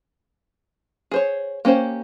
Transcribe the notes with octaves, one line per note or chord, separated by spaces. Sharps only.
G#4 C5 C#5
A#3 C#4 G4 C5